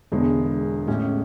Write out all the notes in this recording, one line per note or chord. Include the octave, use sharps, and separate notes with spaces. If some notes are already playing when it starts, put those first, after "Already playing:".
E1 E2 D3 G#3
A1 A2 G#3 C#4